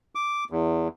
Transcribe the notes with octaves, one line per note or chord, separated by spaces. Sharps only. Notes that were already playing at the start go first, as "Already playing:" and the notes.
D6
E2